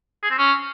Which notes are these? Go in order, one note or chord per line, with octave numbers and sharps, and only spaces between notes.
G#4
C4
C#4